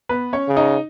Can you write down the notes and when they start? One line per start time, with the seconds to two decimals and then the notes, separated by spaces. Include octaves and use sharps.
0.09 B3 B4
0.33 C#4 C#5
0.49 C#3
0.56 D#4 D#5